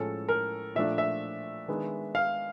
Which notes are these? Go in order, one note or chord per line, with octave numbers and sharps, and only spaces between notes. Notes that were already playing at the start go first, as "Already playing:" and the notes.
Already playing: A2 F3 G#3 C#4 A4
A#4
A#2 F3 A3 D4 E5
E5
D#3 G#3 B3 D4
F5